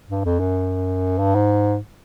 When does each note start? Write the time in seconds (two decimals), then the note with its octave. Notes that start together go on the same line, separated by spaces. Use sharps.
0.09 G2
0.25 F2
0.40 F#2
1.19 G2
1.35 G#2